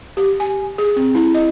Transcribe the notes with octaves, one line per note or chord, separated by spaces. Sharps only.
G4
G#5
G#4
C4
E4
D#5